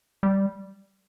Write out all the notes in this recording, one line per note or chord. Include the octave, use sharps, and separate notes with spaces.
G3